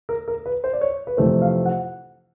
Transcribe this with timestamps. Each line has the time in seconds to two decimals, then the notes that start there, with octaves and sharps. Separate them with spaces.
0.09 A#4
0.28 A#4
0.46 B4
0.64 C5
0.73 D5
0.81 C#5
1.07 B4
1.17 F2 C3 E3 A3 C5
1.42 F5
1.65 F#5